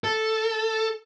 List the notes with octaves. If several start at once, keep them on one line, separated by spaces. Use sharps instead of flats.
A4